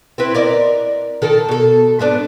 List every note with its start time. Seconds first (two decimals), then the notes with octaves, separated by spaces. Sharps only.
0.18 C4 E4 B4
0.35 A#4 D5 D#5
1.22 D#3 A4 A#4
1.48 B2 A4
1.99 G#2 B3 D4